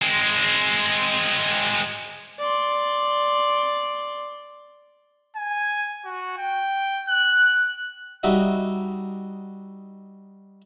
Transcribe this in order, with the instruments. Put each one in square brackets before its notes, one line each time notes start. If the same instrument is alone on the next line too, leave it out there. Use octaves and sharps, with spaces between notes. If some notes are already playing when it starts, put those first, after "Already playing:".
[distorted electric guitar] G#3 C4
[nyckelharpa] D5 C6
[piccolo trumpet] G#5
F#4
G5
F#6
[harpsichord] G3 D#4 F#4 D#5 E5